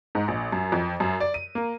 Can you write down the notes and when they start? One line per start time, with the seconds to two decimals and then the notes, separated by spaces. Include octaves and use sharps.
0.15 G#2
0.28 A#1
0.52 F#2
0.72 F2
1.00 F#2
1.20 D5
1.34 D#7
1.55 A#3